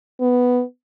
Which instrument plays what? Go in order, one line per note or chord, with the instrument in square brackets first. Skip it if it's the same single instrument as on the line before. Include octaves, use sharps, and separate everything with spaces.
[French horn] B3